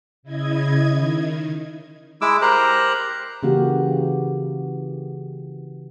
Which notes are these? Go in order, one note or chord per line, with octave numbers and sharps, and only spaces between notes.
C#3 E4 D#5 G#6
D#3
G#3 E4 D6 E6
G4 A#4 C5 A#5 F#6
C#3 E3 A#3 F#4 G4